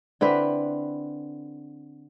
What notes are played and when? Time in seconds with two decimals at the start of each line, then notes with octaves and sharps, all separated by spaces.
0.21 D3 C4 E4 B4